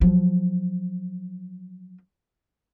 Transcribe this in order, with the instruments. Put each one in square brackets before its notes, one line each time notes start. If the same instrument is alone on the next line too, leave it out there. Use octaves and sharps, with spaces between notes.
[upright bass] F3 F#3